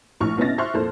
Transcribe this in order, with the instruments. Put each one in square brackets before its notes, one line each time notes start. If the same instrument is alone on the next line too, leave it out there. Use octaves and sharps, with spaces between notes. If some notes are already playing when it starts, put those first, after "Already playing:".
[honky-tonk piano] A#1 A2 C#6 F6
C2 B3 C#4 D#5 A6 A#6
C5 E5 C6 C#6 F6 F#6
F2 A#2 A4 C5